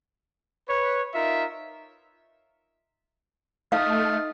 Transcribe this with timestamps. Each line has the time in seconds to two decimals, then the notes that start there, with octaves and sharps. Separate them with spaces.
0.68 B4 C#5
1.14 D#4 F4 A#4 E5
3.72 A3 D#4 F4 F5 D#6